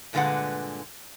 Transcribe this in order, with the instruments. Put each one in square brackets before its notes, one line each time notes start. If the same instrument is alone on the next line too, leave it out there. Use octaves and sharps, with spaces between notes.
[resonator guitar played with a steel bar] G2 A#2 D3 G#3 B4 F#5